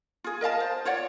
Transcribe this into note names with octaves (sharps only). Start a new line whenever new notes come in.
F4 G#4
A#4 D#5 F5 A5
C5
F4 C#5 D5 F#5